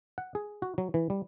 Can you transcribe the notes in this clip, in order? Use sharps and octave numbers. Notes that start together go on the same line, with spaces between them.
F#5
G#4
F#4
F#3
E3
G3